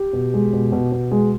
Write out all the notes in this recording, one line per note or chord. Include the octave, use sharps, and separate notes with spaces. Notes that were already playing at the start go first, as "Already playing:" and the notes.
Already playing: G4
B2
G#3
B2
B2
B2
G#3